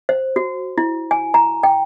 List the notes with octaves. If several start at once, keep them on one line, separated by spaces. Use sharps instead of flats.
C5
F#4
E4
G#5
A#5
G5